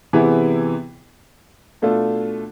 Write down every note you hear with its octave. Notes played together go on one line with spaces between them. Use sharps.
C3 E3 B3 E4 G#4
B2 A3 D4 F4 A4